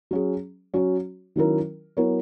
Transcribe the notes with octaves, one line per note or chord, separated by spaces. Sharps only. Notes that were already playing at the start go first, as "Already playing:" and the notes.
F#3 C#4 G#4
F#3 C#4 F#4 C#5
D#3 F#3 C#4 E4 A#4
F#3 B3 E4 A#4 C#5